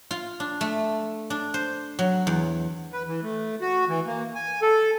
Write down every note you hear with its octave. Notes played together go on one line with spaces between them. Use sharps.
F4
D4
A3
D4
C5
F#3
E2
B4
E3
A3
F#4
E3
A#3
G#5
A4